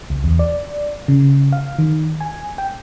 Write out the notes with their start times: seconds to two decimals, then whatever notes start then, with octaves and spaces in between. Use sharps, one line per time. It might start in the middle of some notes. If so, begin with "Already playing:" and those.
0.10 C#2
0.24 E2
0.39 D5
1.08 C#3
1.53 F5
1.79 D#3
2.21 G#5
2.58 G5